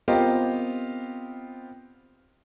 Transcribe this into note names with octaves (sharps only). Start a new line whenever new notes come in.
B3 C4 F4 G4 A#4 D#5